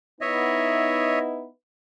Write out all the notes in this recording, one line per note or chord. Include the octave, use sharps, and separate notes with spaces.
B3 D#4 E4 C#5 D#5 E5